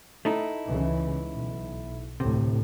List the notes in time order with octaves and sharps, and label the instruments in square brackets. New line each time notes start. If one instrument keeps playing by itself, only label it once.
[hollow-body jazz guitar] A3 D#4 E4
[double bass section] C#2 C#3 E3
B1
[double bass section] D2 A2 [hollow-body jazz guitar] C3